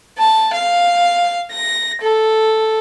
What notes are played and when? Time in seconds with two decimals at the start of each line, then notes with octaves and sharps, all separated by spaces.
0.18 A5
0.53 F5
1.52 A#6
2.01 A4